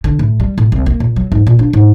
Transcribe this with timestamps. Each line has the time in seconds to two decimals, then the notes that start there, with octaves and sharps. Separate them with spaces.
0.04 D3
0.19 A2
0.40 G3
0.58 A2
0.72 C2
0.86 A#3
1.00 A#2
1.16 F#3
1.32 G#2
1.47 A#2
1.59 D4
1.73 G#2